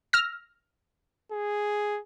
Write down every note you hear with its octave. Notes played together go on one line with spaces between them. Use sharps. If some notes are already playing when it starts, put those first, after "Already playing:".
E6 F6 A#6
G#4